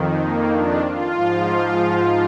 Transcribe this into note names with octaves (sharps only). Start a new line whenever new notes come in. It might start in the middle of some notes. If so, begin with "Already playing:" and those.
Already playing: F2 D#3
A#3
D4
F4
G#2 F3